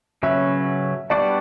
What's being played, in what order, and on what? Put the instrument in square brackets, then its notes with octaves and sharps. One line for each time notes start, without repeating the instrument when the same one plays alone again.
[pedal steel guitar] C#3 F#3 C#4 F#4 B4 [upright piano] E5
[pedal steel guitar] G3 B3 D4 F#4 [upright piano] D5